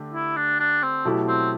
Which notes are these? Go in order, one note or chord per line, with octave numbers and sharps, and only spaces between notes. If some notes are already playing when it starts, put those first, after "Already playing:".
Already playing: D3 A3 G4
E4
D4
D4
C4
B2 F#3 A3 E4 G4
C4